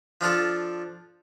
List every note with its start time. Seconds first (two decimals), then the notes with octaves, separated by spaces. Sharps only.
0.21 F3 D4 F4 A4